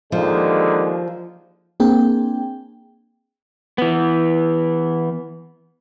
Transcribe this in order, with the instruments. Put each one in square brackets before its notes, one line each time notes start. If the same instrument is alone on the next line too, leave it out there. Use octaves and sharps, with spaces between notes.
[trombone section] D#2 D3 G#3 [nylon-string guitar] F3
[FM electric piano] A#3 C4 D4 G#4 G5
[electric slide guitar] E3 B3